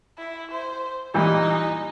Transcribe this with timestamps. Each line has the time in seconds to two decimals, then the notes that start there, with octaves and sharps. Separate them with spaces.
0.18 E4
0.52 C5
1.14 A#2 E3 G3 D#4